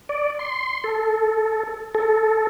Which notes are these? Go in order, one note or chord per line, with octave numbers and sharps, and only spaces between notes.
D5
C6
A4
A4